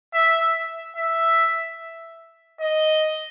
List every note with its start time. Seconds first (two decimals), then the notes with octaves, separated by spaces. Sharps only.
0.14 E5
0.97 E5
2.61 D#5